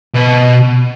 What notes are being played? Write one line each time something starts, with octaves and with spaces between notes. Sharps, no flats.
B2